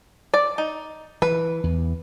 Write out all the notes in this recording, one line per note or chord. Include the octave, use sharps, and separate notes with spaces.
D5
D#4
E3 B4
E2